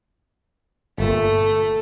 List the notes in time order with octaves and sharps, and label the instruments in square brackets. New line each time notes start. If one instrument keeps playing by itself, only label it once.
[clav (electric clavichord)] G1 A#2 [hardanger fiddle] A3